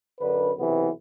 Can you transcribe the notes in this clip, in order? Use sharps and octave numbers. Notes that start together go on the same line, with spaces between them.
F#2 D3 D4 B4
B1 C3 E3 B3 E4